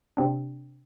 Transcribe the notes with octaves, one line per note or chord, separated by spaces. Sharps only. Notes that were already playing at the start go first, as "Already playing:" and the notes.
C3 C4 D4